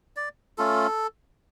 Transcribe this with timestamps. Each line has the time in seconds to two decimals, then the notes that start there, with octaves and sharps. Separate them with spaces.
0.16 D5
0.58 A3 C#4 F4 A4